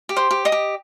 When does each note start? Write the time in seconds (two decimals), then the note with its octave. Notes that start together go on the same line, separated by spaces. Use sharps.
0.09 G4
0.16 C5 C6
0.31 G4
0.45 D#5 D#6
0.52 G4